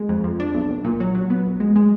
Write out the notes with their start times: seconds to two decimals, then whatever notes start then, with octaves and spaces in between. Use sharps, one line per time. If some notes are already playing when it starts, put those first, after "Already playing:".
Already playing: G#3
0.09 F2
0.24 F2
0.40 D4
0.55 B1
0.70 B1
0.84 A#2
1.00 F#3
1.15 F#3
1.30 B3
1.46 A#1
1.60 G#3
1.76 G#3